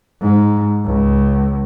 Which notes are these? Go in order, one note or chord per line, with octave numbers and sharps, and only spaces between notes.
G#2
C#2